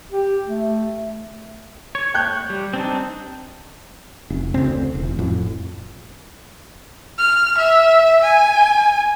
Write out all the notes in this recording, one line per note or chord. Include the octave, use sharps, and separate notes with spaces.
G4
A3
C#5
G5 F#6 G6
G3
C4 D4 D#4
F1
D2 C#3 C4
E1
F2 A2
F6
E5
G#5